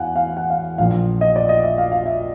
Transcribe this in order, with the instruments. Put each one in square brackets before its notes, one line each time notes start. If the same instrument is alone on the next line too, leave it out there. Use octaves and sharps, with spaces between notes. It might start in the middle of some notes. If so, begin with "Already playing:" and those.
Already playing: [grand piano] E2 F5 F#5 G#5
F5
F#5
F5
A#1 A#2 F3 F5
D#5
D5
D#5
E5
F5
F5
E5